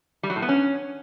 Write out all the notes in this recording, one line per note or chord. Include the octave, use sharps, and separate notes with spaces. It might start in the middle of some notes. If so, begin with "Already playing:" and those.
G3
F#3
A2
B3
C#4